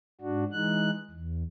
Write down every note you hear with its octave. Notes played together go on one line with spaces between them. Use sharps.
G#2 D4 F#4
E3 G#3 D#4 F#6
E2